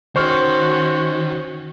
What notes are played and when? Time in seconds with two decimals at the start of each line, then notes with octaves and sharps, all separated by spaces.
0.16 D#3 C#4 F#4 C5 C#6 F6